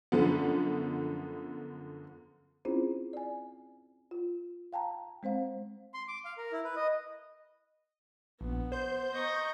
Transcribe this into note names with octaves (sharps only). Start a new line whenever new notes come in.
F#2 D3 F3 B3
C4 C#4 E4 F4 G#4 C5
D5 G#5
F4
F5 G5 A5 A#5
G#3 C4 C5 F5
C6
D6
F5
A#4
E4
B4
D#5
A#1 B3
C5 G6
D#5 A#5 C#6 G6